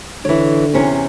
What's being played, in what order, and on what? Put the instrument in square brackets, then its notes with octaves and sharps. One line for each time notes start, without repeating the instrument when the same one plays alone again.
[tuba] D3 [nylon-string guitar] E3 C#5
[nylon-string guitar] E2 C3 C#4